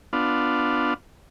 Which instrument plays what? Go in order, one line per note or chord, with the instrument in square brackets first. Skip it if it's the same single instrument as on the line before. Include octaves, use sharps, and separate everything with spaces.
[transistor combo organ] B3 D4 F4